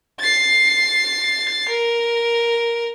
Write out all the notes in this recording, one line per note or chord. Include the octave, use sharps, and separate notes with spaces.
A6 C7
A#4